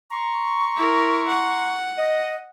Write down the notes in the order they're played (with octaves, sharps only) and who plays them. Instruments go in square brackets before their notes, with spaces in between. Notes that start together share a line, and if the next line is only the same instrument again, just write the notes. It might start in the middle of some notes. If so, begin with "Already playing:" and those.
[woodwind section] A#5 C6 C#6
[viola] E4 A#4
F#5
[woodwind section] D#5